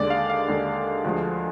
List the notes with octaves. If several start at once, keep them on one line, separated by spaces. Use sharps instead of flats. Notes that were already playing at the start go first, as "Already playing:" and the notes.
Already playing: D#2 D3 G#3 D5
F5
F5
D#2 D3 G#3
D2 D3 F3 G#3